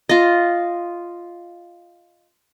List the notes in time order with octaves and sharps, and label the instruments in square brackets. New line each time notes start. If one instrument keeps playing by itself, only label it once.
[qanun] F4 D#5